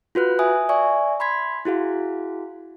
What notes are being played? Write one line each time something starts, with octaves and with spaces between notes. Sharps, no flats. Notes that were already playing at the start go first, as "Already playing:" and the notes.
F4 F#4 B4 F#6
E5 G#5 D#6
D5 E5 G#5 C#6
B5 C6 G#6 B6
E4 F#4 G#4 F5